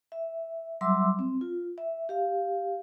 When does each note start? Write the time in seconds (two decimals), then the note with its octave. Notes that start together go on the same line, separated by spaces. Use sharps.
0.12 E5
0.81 F#3 G3 E5 C6 D6 E6
1.19 C4
1.41 F4
1.78 E5
2.09 G4 F5